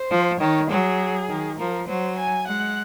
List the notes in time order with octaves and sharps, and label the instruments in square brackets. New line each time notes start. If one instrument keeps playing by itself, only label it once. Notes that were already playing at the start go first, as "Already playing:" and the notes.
Already playing: [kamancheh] C5
[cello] F3
[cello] D#3 [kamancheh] C#5
[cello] F#3 [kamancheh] G#4
[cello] D#3
[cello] F3 [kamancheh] A#4
[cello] F#3 [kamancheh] C5
[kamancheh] G#5
[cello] G#3 [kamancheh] F#5